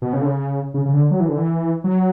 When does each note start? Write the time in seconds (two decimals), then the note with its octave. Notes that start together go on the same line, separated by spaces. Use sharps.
0.02 B2
0.13 C#3
0.21 D3
0.25 C#3
0.74 C#3
0.85 C#3
0.93 D3
1.11 F#3
1.20 E3
1.29 D3
1.37 E3
1.84 F#3